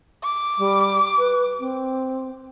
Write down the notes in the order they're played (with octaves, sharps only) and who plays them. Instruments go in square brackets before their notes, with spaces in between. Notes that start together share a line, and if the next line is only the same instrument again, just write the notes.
[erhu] D6
[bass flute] G3
B4
C4